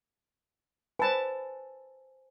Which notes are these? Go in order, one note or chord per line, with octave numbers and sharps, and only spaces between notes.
B4 C5 G#5 A5